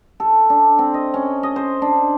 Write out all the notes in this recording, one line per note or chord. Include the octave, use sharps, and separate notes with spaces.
A4
D4
C4
D#5
C#4
D#5
C5
D4